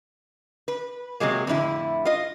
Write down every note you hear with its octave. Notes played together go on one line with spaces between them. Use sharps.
B4
C3 F#3 G#3 A#3
F2 A2 D3 E4
F4 D#5